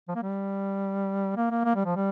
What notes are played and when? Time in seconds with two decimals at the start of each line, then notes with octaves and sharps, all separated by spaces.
0.08 F3
0.15 A#3
0.22 G3
1.36 A#3
1.51 A#3
1.65 A#3
1.75 G3
1.85 F3
1.96 G3